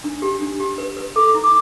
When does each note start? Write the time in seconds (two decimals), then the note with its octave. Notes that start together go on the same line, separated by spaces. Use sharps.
0.04 D4
0.22 G4
0.41 D4
0.60 G4
0.78 B4
0.97 B4
1.16 A4 D6
1.34 E4
1.44 D6